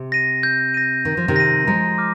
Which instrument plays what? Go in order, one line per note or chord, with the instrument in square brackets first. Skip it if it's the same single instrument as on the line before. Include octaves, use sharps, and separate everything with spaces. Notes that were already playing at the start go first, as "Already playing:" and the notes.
Already playing: [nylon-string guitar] C3
[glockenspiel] A#6 D#7
G6
A#6 D#7
[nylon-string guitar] D#3 [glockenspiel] G6
[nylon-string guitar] F3
C3 D#3
[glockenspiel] A#6 D#7
[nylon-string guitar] F3 G#3 [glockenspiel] A#5
[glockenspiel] D6 F6